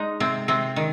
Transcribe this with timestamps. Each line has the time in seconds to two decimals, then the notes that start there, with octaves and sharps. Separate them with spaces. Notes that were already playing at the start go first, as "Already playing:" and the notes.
Already playing: G#3 D#4
0.20 C3 C4
0.48 C3 C4
0.76 D#3